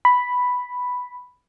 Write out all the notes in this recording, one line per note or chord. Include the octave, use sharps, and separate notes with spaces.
B5